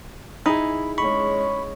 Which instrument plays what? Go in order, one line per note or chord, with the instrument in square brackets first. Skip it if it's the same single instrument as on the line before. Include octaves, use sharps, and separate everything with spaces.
[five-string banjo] D#4 E4 G#4 [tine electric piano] B5
[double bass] G#3 C#4 [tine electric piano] B5 C#6